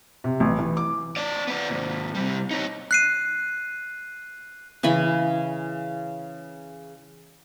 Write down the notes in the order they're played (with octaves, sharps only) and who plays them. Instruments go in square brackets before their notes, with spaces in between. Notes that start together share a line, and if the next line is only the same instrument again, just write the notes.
[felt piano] C3
A1
E3
D6
[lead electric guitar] C#4 D5
B3 D5
D#2 G#2
C3 G3
D#4 C#5
[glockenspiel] F#6 C7 D#7
[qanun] C#3 E3 G#5 B5